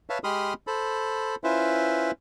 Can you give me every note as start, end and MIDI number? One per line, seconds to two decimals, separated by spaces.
0.10 0.18 71
0.10 0.18 73
0.10 0.18 76
0.10 0.18 77
0.10 0.18 81
0.24 0.54 56
0.24 0.54 67
0.24 0.54 83
0.24 0.54 84
0.24 0.54 87
0.24 0.54 89
0.67 1.35 69
0.67 1.35 72
0.67 1.35 83
1.44 2.11 61
1.44 2.11 64
1.44 2.11 65
1.44 2.11 71
1.44 2.11 72
1.44 2.11 76